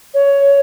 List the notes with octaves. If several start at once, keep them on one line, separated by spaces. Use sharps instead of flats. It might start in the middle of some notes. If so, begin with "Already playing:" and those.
C#5